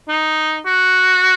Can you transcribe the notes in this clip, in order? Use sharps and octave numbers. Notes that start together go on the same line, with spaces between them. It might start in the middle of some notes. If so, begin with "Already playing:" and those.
D#4
F#4